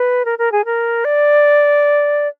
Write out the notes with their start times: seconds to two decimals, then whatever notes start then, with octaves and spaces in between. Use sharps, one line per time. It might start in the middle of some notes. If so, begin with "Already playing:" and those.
Already playing: B4
0.25 A#4
0.38 A#4
0.52 G#4
0.65 A#4
1.05 D5